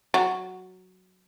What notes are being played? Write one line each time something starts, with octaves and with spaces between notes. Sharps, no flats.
F#3